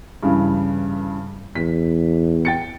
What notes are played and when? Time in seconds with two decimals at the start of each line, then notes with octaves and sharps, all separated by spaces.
0.23 G2 C#3 E3
1.55 E2 B6
2.45 G5 A6 C#7